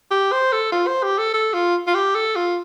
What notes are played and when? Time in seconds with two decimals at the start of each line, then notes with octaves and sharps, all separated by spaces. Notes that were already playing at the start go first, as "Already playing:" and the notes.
0.11 G4
0.32 C5
0.53 A4
0.72 F4
0.87 C5
1.03 G4
1.18 A4
1.34 A4
1.54 F4
1.87 F4
1.95 G4
2.15 A4
2.36 F4